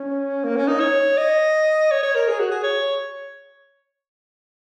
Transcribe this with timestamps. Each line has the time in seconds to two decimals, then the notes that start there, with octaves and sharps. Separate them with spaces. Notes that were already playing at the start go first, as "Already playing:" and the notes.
Already playing: C#4
0.44 A#3
0.57 C#4
0.68 D#4
0.80 C#5
1.18 D#5
1.91 C#5
2.03 C#5
2.15 A#4
2.28 G#4
2.40 F#4
2.51 G#4
2.63 C#5